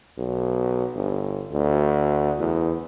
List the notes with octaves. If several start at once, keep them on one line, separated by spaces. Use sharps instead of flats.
B1
G1
D2
E2